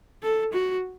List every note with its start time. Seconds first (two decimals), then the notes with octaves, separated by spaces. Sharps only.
0.23 A4
0.53 F#4